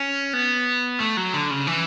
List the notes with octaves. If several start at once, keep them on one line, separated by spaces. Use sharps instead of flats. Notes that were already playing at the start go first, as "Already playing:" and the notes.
Already playing: C#4
B3
A3
F#3
D3
C#3
E3